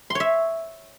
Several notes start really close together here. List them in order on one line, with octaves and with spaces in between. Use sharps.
C6 C#5 E5